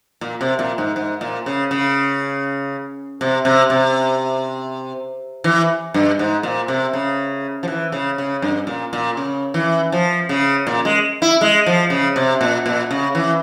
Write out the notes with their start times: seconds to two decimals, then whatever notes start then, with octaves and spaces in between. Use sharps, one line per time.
0.21 A#2
0.41 C3
0.59 A#2
0.78 G#2
0.96 G#2
1.21 A#2
1.46 C#3
1.71 C#3
3.21 C3
3.45 C3
3.70 C3
5.44 E3
5.94 G2
6.19 G#2
6.43 A#2
6.68 C3
6.93 C#3
7.63 F3
7.68 E3
7.92 C#3
8.18 C#3
8.42 G2
8.67 A#2
8.93 A#2
9.17 C#3
9.54 E3
9.92 F3
10.29 C#3
10.67 A#2
10.85 G#3
11.22 E4
11.41 G#3
11.66 F3
11.90 C#3
12.16 C3
12.41 A#2
12.66 A#2
12.91 C#3
13.15 E3